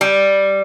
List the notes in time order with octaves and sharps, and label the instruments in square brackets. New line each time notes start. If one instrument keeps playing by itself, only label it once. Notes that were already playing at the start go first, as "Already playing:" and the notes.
[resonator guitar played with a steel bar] G3